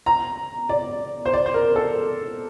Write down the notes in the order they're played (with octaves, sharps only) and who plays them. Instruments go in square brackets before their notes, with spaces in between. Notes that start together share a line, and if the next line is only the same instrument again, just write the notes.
[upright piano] A#5
D5
C5
D5
C5
A#4
A4